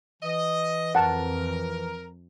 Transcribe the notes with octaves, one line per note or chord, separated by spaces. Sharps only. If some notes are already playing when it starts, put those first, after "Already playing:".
E3 D#5
F2 A#4 F#5 A5